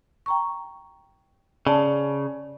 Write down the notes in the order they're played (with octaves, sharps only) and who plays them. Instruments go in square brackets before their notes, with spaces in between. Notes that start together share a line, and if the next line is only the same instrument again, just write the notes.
[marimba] G5 A#5 C#6
[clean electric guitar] C#3 [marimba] D5 A5